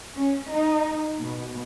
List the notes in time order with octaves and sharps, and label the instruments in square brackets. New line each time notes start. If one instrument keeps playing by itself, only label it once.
[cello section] C#4
D#4
B2